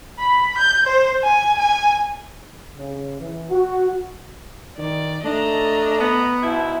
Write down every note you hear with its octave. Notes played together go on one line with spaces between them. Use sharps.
B5
G6
C5
G#5
G#5
C#3
E3
F#4
D#3 D5
A3 D4 D#5 A#5
B3
G#2 B2 E4